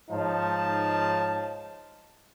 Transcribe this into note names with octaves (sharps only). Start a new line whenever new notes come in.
G#2 F3 D#4 C#5 F5 A5